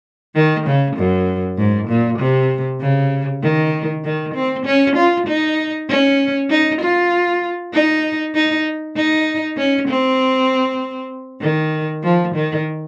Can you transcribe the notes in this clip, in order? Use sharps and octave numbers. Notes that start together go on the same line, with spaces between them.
D#3
C#3
F#2
G#2
A#2
C3
C#3
D#3
D#3
C4
C#4
F4
D#4
C#4
D#4
F4
D#4
D#4
D#4
C#4
C4
D#3
F3
D#3